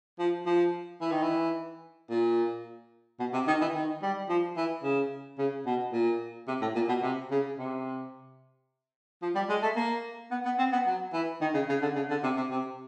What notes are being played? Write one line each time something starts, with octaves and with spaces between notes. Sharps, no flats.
F3
F3
E3
D#3
E3
A#2
B2
C3
D#3
E3
D#3
G3
F3
E3
C#3
C#3
B2
A#2
C3
A2
A#2
B2
C3
C#3
C3
F3
G3
G#3
A3
A#3
B3
B3
C4
B3
F#3
E3
D#3
C#3
C#3
D3
C#3
D3
C3
C3
C3